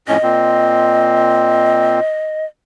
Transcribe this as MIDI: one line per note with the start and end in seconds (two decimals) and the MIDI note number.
0.08 0.17 41
0.08 0.17 45
0.08 0.17 61
0.08 2.45 75
0.23 2.00 46
0.23 2.00 60